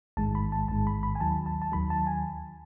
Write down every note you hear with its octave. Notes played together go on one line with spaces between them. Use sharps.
A1 G#2 D#3 G#3 A5
B5
A5
A1 G#2 D#3 G#3 A5
B5
B5
G#5
D#2 D#3 F#3 A5
A5
A5
D#2 D#3 F#3 B5
A5
G#5